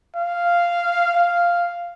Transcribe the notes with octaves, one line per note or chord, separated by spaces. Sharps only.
F5
F5